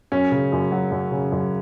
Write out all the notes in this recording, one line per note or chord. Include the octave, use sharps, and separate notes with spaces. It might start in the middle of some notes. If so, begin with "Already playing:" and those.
F#2 C#4
C#3
F#2
F#3
F#2
C#3
F#2